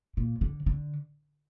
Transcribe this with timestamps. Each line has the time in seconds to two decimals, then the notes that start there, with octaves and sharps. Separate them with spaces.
0.17 A#2
0.41 D3
0.66 D3